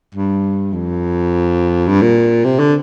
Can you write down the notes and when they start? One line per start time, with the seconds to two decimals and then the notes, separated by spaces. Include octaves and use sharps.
0.15 G2
0.73 F2
1.88 G2
2.02 A#2
2.45 C3
2.59 D3